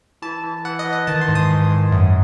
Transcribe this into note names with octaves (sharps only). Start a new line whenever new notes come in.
E3 A5
E3
E3 F#5
D#5
E3
D#5
D#3 A5
C6
G#2
D#6
G#2
G#2
F#2